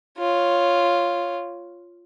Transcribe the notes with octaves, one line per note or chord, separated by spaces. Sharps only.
F4 C#5